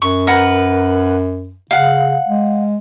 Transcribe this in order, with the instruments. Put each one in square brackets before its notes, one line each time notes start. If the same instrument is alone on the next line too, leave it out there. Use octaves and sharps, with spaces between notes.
[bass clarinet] F#2 [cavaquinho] C#6
[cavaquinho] A#4 B4 F#5
[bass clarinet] C#3 [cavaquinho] F5 F#5
[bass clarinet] G#3